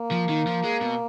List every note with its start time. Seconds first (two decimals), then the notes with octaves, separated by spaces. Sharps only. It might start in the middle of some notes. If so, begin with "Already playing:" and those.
Already playing: A#3
0.11 F3
0.29 D#3
0.47 F3
0.64 G#3
0.81 B2